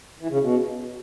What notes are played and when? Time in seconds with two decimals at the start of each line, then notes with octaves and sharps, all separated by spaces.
0.20 E3
0.30 C#3
0.41 B2